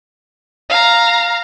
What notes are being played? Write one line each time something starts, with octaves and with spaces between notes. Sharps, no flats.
F5 A#5